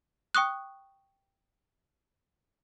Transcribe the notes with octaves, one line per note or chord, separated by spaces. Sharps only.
G5 C#6 D#6 F#6